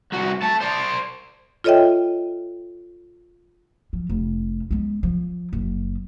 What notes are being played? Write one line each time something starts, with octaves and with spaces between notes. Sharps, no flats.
C2 F#4
A3 A5
C5 D5
F4 A4 C#5 D#5 E5 G5
F3
F1
G#3 B3
F3
F#1